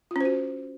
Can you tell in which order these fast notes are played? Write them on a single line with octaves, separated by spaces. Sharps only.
F4 C#4 C5 F#4